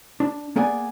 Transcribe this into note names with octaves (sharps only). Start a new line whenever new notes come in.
D4
A#3 B3 G#4 D5 G#5